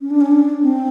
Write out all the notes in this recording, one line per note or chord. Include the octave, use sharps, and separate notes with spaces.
C#4
D4
C#4
D4
C4